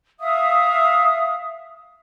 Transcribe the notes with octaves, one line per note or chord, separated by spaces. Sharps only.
E5 F5 D#6